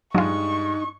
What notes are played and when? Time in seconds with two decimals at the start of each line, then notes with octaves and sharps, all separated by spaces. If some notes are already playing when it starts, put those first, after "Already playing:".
0.15 G2 F#3 G#3 D#4 F4 C#6